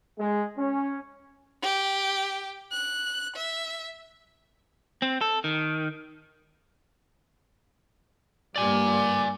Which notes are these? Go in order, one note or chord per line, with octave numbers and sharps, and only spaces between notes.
G#3
C#4
G4
F#6
E5
C4
A4
D#3
G2 G3 A#3 D5 G#5 D6